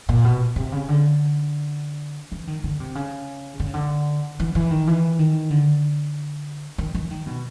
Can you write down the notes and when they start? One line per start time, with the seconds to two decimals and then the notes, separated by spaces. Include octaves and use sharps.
0.09 A#2
0.24 B2
0.56 C3
0.72 C#3
0.88 D3
2.32 E3
2.47 D#3
2.64 D3
2.80 C3
2.95 C#3
3.60 D3
3.66 C#3
3.74 D3
4.40 E3
4.55 E3
4.71 D#3
4.87 E3
5.19 D#3
5.50 D3
6.78 D#3
6.94 E3
7.11 D#3
7.26 B2